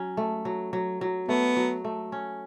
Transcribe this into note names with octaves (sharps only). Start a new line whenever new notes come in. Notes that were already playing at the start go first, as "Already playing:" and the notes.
Already playing: F#3 C#4
A3
F#3
F#3
F#3
A3 B3
F#3
A3
C#4